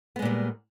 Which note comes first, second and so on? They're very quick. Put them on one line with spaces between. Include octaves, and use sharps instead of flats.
B3 G#3 A#2 G3